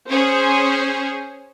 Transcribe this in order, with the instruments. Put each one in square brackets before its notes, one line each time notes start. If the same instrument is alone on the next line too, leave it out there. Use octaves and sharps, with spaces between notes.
[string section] C#4 G#4 [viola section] C5